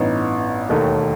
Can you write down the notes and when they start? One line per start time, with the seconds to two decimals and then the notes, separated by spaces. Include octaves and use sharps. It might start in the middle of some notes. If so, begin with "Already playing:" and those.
Already playing: A1 G2 E3 B3 D#4
0.69 E1 D#2 D#3 A3